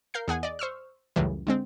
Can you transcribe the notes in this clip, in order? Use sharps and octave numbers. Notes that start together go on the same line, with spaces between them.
A#4 F5 G6 C7
E2 G#4 F#5 G#5
D5 D#5
C5 C#6 E6 F6
C#2 F#2 A2 E3 G3
D3 G#3 C4